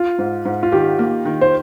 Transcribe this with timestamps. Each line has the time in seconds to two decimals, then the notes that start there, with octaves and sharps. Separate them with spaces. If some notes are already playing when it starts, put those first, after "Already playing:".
Already playing: F4
0.19 G#2
0.45 G#2
0.63 F4
0.72 D#3 G4
0.99 A#3
1.25 D#3
1.41 C5